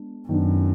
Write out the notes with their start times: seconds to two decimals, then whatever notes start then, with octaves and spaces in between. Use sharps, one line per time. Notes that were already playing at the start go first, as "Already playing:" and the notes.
Already playing: G#3 B3 D4
0.29 F#2 D#3 F#3 B3 D4